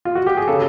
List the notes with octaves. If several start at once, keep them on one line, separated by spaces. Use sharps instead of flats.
F4
F#4
G4
G#4
C#3 A4